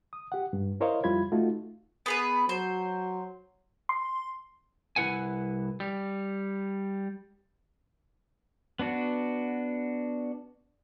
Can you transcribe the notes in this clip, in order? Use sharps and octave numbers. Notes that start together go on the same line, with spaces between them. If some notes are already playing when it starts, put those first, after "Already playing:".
D#6
G4 F#5
G2
E4 A#4 C5 C#5 D#5 F5
F2 G3 E4 F4 B5 G#6
A3 D#4 F4 F#4
B3 G#4 B4
F#3 C5
C6
C2 E4 B4 F#5 G#5
G3
B3 D4 F#4